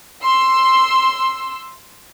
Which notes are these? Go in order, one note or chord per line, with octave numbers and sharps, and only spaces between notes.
C6 E6